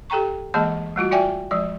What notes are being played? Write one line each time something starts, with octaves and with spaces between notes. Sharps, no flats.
G4 A4 G5 A#5 C#6
E3 G#3 A#3 G#4 D#5 A5
G3 A3 F4 F#4
F4 F#4 D5 E5 G5 G#5
F3 G#3 D5